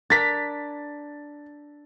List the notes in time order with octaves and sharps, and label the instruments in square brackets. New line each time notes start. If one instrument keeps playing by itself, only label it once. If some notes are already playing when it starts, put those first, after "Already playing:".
[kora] D4 A#4 [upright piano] A6 B6